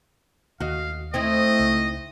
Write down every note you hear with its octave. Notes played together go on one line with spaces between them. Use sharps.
D#2 F#4 D#5 F5
A3 C4 D#4 E4 D#5
C#2